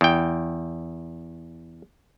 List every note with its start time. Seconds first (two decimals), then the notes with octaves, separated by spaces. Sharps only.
0.01 E2 G5